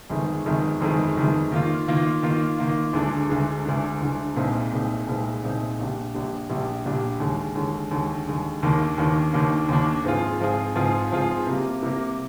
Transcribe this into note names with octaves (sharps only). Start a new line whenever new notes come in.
G1 F2 D#3 G#3
G1 F2 D#3 G#3
G1 F2 D#3 G#3
G1 F2 D#3 G#3
D#3 A#3 F4
D#3 A#3 F4
D#3 A#3 F4
D#3 A#3 F4
D2 D3 G#3 D4
D2 D3 G#3 D4
D2 D3 G#3 D4
D2 D3 G#3 D4
C2 A#2 G#3 C4 D#4
C2 A#2 G#3 C4 D#4
C2 A#2 G#3 C4 D#4
C2 A#2 G#3 C4 D#4
A#1 A#2 G3 D4
A#1 A#2 G3 D4
A#1 A#2 G3 D4
A#1 A#2 G3 D4
D#2 D3 G#3
D#2 D3 G#3
D#2 D3 G#3
D#2 D3 G#3
D#2 D#3 A#3 D4
D#2 D#3 A#3 D4
D#2 D#3 A#3 D4
D#2 D#3 A#3 D4
G#2 F3 C4 F4 G#4
G#2 F3 C4 F4 G#4
G#2 F3 C4 F4 G#4
G#2 F3 C4 F4 G#4
C3 G3 A#3
C3 G3 A#3